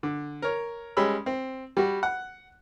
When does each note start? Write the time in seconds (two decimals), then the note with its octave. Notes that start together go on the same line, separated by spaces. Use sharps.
0.03 D3
0.42 A#4 C#5
0.97 G3 G#3 C#4 B5 E6
1.26 C4
1.77 G3 F#4
2.03 F#5